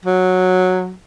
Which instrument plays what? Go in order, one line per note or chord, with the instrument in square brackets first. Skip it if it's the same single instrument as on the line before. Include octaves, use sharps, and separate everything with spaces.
[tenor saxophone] F#3